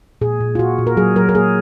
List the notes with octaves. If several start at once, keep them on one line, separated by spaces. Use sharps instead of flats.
A#2 G#4
A#2
F4
A#2 F#4
A#2
A#4
F#3 G#4
F#3 A#4
A#4
A#3 G#4